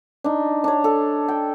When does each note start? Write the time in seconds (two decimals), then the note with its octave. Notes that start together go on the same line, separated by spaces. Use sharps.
0.24 D4 D#4
0.64 D4 C#5
0.84 A4
1.28 G5